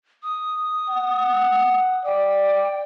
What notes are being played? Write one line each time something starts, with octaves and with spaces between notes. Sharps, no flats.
D#6
F#5
D5 G5